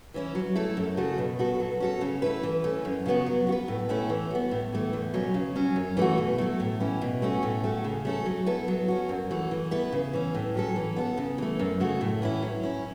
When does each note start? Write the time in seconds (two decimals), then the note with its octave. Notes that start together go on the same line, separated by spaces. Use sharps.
0.14 E3 C#4 E4
0.35 F#3
0.55 A3 E4 A4
0.77 F#2
0.97 C#3 A3 F#4 A4
1.18 B2
1.39 B3 F#4 A4
1.60 F#3
1.80 C#4 F#4 A4
2.01 C#3
2.22 A3 E4 B4
2.43 E3
2.64 A3 C#4
2.85 F#2
3.06 C#3 F#3 B3 F#4
3.26 F#3
3.47 B3 F#4
3.52 B4
3.68 A2
3.89 A3 C#4 E4
4.09 E3
4.30 B3 F#4
4.51 A2
4.72 E3 A3
4.93 E2
5.14 B2 F#3 C#4
5.34 C#3
5.55 F#3 C#4
5.76 F#2
5.97 E3 A3 F#4
6.18 B2
6.38 F#3 A3
6.60 A2
6.80 E3 C#4 E4
7.01 B2
7.22 A3 C#4 F#4
7.43 A2
7.64 A3 C#4 F#4
7.84 C#3
8.05 A3 C#4 E4 A4
8.26 F#3
8.46 B3 E4 A4
8.68 F#3
8.88 C#4 F#4
9.09 F#2
9.30 E3 A3 F#4
9.51 E3
9.71 B3 E4 B4
9.92 C#3
10.13 E3 C#4
10.35 A2
10.55 F#3 C#4 A4
10.76 E3
10.96 B3 E4 A4
11.17 C#3
11.38 E3 A3
11.59 F#2
11.80 C#3 A3 F#4
12.01 A2
12.22 E3 C#4 E4
12.43 F#3
12.63 C#4 E4